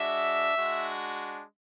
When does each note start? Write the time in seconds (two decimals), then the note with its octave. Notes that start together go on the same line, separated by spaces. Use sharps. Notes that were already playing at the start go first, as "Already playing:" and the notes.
Already playing: G#3 D4 F#4 E5
0.56 G#3 D4 F#4